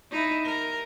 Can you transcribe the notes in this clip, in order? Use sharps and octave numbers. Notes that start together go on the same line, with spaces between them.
D#4 E4
A#4